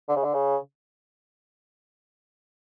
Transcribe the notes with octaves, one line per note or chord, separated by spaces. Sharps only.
D3
C#3
D3
C#3